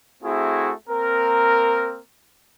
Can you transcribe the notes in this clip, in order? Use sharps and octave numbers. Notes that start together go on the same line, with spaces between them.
A3 C4 E4 F#4 G#4
A#3 C4 A#4